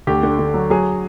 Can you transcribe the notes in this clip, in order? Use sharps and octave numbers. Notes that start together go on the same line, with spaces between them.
D2 G4
D3
D3
F#3
F#3 G#4